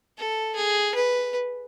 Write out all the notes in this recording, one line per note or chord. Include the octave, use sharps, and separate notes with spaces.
A4
G#4
B4